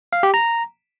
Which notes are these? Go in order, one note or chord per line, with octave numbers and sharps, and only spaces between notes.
F5
G4
A#5